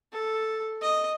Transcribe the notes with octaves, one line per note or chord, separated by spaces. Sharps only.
A4
D#5